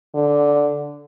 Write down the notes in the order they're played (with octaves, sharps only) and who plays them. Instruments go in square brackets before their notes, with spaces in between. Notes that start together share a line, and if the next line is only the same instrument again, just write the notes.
[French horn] D3